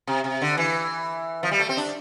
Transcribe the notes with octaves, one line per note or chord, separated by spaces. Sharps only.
C3
C3
D3
E3
F3
G3
A3
C4
D4